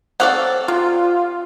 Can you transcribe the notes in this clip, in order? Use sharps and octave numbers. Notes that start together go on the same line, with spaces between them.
C4 A4 C#5 D5 F5 F#5
C3 F4